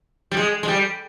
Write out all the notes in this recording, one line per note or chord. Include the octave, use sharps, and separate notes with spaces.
G3
G#3
G#3
G3